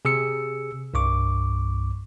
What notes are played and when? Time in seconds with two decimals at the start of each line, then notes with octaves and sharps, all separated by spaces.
0.05 C3 G#4 E6 C#7
0.94 C2 G2 C#6 D6